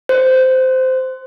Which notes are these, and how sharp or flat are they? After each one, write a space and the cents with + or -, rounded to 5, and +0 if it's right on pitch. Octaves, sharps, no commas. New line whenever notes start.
C5 -15